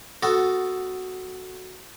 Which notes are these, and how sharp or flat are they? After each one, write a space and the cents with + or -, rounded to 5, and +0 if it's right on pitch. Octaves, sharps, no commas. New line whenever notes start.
B3 +10 F#4 +0 A4 +0